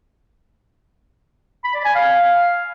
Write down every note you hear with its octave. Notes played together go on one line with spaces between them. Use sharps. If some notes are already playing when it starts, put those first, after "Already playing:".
B5
D5
G#5
F5